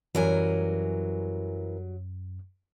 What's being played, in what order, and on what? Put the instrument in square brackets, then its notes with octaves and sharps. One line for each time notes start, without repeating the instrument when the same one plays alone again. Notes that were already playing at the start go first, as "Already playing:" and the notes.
[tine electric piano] F#2 [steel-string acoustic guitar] E3 A#4 G#5 [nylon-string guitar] F#3 G3